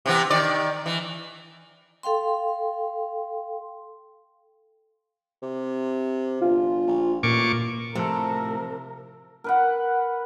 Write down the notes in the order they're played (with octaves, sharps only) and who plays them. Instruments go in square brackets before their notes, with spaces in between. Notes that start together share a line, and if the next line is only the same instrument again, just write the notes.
[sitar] C3 E3 B3
D#3 D5
E3
[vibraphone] A4 F5 G5 C6
[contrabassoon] C3
[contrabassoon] G1 [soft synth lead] F4
[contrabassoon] A#1
[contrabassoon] A1 [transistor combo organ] A#2 C#6 D6
[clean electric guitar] A2 A4 [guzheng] C3 [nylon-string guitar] F3 [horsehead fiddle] A#4
[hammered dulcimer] A#4 B4 F#5